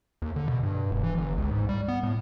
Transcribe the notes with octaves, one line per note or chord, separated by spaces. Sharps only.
D#2
D3
B2
G2
E1
E3
G1
C#2
G#2
G3
B3
A2